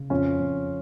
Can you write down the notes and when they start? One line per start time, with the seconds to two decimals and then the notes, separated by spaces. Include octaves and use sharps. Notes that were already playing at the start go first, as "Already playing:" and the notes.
Already playing: C#3
0.10 F2 C#4 F4
0.40 F2